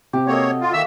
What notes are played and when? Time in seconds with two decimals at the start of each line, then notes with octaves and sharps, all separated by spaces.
0.13 C3 G4
0.27 A#3 F#4 A4 C#5 D#5
0.61 F4
0.73 D#3 A#3 F#4 E5 E6